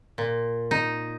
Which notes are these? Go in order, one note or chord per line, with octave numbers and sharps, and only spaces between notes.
A#2
D#4